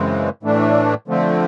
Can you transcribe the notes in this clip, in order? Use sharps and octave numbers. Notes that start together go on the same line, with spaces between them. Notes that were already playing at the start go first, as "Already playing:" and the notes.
Already playing: F#2 C#3 E3 G#3 C4
A2 E3 A3 D4
D3 F3 A3 C4